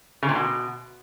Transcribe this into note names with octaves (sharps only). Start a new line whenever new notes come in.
C#3
A#2
B2